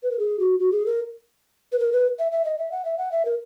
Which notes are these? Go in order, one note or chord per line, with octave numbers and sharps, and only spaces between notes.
B4
A#4
G#4
F#4
F#4
G#4
A#4
B4
A#4
B4
E5
E5
D#5
E5
F#5
E5
F#5
E5
A#4